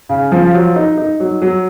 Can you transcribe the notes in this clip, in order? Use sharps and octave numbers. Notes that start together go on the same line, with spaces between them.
C#3
F3
F#3
D#4
D#4
F#3
F#3